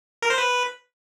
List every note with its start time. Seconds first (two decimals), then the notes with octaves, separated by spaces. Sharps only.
0.22 A#4
0.30 C5
0.38 B4